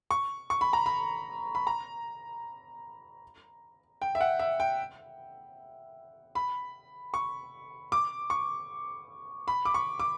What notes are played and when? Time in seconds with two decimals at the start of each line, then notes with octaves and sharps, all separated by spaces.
0.11 C#6
0.50 C#6
0.61 B5
0.73 A#5
0.86 B5
1.55 B5
1.67 A#5
4.02 G5
4.15 E5
4.21 F#5
4.39 E5
4.60 G5
6.35 B5
7.14 C#6
7.92 D6
8.30 C#6
9.48 B5
9.65 D6
9.74 C#6
10.00 D6